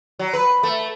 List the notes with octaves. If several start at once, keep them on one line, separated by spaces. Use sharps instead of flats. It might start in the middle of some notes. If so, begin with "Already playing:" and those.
F#3
B4
A3